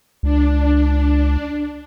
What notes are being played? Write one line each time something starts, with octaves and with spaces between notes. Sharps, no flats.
C#2 D4